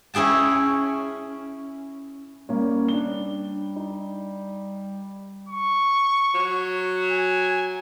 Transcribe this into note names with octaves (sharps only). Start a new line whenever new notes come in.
C#4 E4 G#4 G5 A5
G3 A#3 C#4
D4 G7
D#4
C#6
F#3
G#5